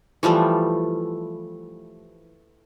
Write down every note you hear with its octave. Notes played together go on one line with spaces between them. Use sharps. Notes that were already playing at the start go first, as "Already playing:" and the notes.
E3 F3 G3 A3